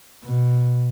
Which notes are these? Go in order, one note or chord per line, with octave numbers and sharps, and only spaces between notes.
B2